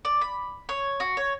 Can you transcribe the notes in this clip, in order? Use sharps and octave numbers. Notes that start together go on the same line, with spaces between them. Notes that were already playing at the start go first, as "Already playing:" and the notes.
D5
B5
C#5
F#4
C#5